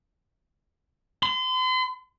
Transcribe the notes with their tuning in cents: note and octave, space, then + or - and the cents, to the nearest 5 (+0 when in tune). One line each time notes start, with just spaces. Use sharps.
C6 -40